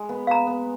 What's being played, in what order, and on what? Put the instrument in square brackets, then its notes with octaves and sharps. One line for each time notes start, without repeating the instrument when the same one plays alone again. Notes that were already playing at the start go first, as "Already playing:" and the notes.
Already playing: [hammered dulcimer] G#3
B3
[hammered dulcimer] B3 [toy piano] F5 A#5
[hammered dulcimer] B3